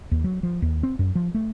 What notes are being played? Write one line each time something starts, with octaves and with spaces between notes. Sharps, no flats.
D#2
F#3
F3
D#2
C4
F#2
F3
A3